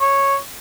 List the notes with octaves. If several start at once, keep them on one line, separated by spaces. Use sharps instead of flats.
C#5